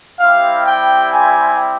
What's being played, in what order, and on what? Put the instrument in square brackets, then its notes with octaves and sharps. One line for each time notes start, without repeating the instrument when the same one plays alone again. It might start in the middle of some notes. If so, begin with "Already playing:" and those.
[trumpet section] G3 C4 E4 G4 F5
G5
G#5